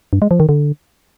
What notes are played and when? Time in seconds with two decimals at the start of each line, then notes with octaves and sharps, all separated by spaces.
0.13 G2
0.22 G#3
0.31 F3
0.40 D#3
0.49 D3